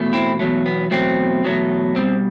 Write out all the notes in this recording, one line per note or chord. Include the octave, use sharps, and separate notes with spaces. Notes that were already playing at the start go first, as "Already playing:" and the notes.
Already playing: E2 B2 A3
C4 E4
E2 B2 F#3 A3
B3
E2 B2 F#3 A3 C4
E2 B2 F#3 A3
B2 G3 C4